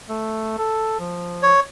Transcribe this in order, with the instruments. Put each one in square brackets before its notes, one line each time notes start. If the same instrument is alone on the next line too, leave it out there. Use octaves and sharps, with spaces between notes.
[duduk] A3
A4
F3
[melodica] C#5